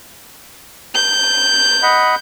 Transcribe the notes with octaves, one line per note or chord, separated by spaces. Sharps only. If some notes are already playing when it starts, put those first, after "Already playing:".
G6
D#5 F#5 B5